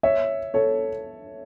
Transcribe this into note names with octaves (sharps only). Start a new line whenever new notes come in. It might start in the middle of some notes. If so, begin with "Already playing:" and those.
C#5 E5
A4 C#5